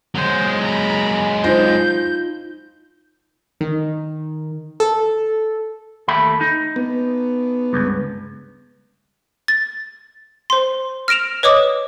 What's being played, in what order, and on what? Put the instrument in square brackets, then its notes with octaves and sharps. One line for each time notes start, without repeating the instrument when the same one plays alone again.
[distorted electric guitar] F#3 G#3 [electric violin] C5
[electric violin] A#5 B5
[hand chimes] D#4 F4 [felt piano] C5 A#6 [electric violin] G6
[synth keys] D#3
A4
[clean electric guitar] D#2 A3 B5
D#4
[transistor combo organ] B3
[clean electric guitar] C#2 G2
[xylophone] A6
C5 C6
F6 A#6 D7 E7 F7
B4 C#5 D#5 D6 D#6